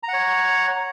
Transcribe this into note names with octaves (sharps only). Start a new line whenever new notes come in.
C#5 F#5 A#5